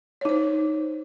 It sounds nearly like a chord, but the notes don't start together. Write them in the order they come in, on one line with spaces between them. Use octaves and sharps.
C#5 D#4 C5